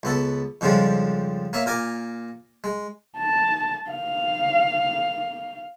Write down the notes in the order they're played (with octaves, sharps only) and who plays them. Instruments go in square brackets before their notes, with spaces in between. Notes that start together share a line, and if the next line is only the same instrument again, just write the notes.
[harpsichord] C#2 B3 A4
F2 G#2 C#3 F3 G3 G#3
A#3 C#5 E5
A#2 A#4 G#5 D6
G#3
[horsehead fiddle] A5
F5